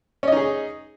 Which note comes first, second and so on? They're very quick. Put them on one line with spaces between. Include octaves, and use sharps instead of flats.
C#4 D#5 D#4 G#4